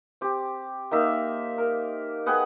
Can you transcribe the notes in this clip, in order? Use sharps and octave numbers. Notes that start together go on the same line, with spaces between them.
C4 G4
A#3 D#4 E5
A#4
B3 G#4 F#5 G5